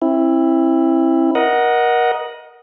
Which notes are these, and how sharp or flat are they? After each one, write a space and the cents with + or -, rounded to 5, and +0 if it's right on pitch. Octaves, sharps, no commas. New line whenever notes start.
C4 +35 E4 +0
A#4 +30 D#5 +0 F#5 +0